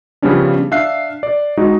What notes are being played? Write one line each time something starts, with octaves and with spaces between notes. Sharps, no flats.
C#3 F3 G3 B3 C#4 D4
D4 E5 F5 F#6 C7
D5
G#3 D#4 F#4